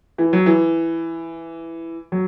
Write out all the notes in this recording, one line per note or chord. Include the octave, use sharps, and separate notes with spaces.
E3
F#3
E3
F#3